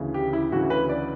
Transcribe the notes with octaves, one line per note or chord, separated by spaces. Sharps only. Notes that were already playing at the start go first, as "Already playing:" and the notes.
Already playing: D2 C#3 E3
G4
E4
D2 C#3 E3 F#4
B4
D5